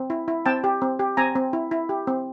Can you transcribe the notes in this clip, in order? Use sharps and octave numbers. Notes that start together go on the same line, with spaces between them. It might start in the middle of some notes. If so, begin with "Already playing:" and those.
Already playing: C4
E4
E4
C4 G5 A5
G4
C4
G4
C4 G#5 A#5
C4
E4
E4
G4
C4